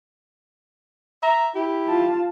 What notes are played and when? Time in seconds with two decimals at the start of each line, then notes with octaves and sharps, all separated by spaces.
1.23 E5 A#5
1.55 E4 G4
1.88 F4 A5